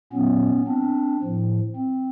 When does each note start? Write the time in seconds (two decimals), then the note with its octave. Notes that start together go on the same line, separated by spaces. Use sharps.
0.13 A#2 F#3 B3 C#4
0.67 C4 D4
1.22 A2 F3
1.76 C4